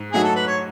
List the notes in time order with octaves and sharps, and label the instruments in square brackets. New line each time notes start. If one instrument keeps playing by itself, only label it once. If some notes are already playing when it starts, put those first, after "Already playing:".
Already playing: [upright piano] G#2
[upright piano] F#3 A3 D#4 F#4 [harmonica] G#4
[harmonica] A4
B4
C#5